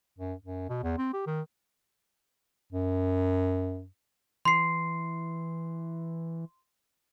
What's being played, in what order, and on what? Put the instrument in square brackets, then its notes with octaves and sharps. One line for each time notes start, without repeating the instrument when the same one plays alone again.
[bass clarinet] F#2
F#2
B2
E2
C4
G4
D#3
F#2
[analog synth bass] E3 [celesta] C6 C7